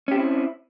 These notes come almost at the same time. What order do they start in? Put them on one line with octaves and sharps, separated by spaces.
C#4 G4 C4 E4